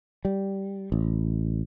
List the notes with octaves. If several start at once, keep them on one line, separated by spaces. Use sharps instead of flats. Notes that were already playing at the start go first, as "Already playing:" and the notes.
G3
A1